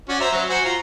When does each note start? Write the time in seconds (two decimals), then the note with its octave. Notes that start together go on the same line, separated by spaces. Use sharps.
0.09 C#4 F#4 D5
0.20 C5 E5 A#5
0.32 F#3
0.49 F#4 C5 G#5
0.65 F4 A#5